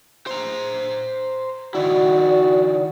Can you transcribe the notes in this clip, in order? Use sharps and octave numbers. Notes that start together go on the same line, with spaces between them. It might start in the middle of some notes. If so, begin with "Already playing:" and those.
C5 A#5
D#3 E4 F#4 D5